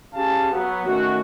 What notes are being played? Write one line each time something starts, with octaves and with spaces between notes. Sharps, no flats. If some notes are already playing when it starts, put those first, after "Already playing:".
C#4 G4 G#4 F5 A5
F#3 B3
D#3 A3 C#4 F#4